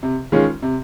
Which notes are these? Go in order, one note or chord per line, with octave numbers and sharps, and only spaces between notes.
C3
D#3 G#3 C#4 F4
C3